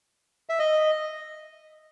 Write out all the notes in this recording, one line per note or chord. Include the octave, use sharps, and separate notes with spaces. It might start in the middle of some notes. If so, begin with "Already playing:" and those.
E5
D#5